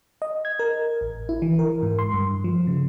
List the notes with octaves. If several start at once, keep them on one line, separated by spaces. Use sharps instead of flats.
D#5
G#6
A#4
A1
E4
E3
A#4
G#2
C6
G2
F3
C#3